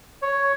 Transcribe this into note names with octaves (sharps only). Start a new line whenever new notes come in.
C#5